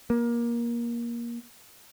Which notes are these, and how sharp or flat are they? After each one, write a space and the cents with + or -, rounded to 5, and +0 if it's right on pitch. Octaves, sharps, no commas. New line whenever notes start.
A#3 +20